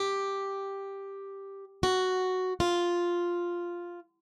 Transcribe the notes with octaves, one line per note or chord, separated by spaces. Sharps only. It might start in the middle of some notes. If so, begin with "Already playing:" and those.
Already playing: G4
F#4
F4